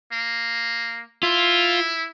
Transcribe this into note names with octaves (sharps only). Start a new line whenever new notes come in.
A#3
E4 F4